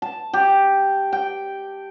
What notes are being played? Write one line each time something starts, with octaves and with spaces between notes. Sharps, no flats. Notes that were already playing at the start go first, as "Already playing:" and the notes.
A5
G4
G5